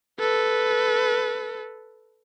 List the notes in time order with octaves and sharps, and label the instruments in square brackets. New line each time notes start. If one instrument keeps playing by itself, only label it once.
[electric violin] A4 B4